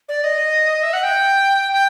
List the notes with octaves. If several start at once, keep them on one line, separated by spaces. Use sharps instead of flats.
D5
D#5
E5
F#5
G5
G5